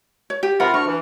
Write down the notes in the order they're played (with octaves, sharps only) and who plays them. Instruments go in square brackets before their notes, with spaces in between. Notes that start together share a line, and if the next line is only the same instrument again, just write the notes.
[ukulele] C#5
G4
[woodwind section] C3 F4 A#4 [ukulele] F#5 B5
[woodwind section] D2 C#6 F6 [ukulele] D4
[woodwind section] E3